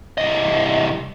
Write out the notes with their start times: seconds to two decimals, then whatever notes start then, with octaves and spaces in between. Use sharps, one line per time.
0.18 C2 D#5